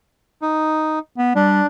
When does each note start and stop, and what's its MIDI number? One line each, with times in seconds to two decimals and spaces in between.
0.42 0.99 63
1.18 1.35 59
1.35 1.62 55
1.35 1.67 62